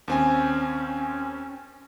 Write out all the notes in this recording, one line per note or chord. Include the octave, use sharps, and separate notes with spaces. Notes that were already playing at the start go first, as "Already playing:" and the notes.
D#2 C4 C#4 G#5